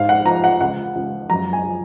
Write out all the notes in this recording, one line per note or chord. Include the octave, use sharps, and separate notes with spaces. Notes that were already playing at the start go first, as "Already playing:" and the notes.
Already playing: G#2 F5
F#5
F3 A#5
F#5
C#2 F#5
C#2
F#2 A#5
G#5
F3